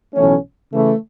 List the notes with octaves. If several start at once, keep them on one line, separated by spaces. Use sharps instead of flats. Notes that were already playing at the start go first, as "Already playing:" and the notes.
B1 A2 E3 A3 C#4
C#3 E3 A3